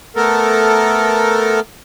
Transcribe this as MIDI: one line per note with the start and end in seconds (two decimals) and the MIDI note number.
0.16 1.60 57
0.16 1.60 59
0.16 1.60 69
0.16 1.60 70